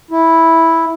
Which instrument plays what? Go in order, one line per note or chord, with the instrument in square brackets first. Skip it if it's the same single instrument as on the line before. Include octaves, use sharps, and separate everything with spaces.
[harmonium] E4